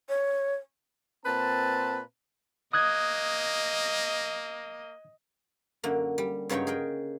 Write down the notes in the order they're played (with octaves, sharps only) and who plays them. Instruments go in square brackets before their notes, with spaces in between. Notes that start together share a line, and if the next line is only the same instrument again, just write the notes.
[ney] C#5
[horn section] A#2 C4 B4 A5
[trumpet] A#3 [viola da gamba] D#5 [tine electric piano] D#6 F#6 G#6
[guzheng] F#2 D3 A#3
G3
G2 C#3 F#3 D#4 C#5 G5
G#4 A#4 G5